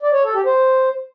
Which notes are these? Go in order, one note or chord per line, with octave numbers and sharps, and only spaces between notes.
D5
C#5
A4
G4
C5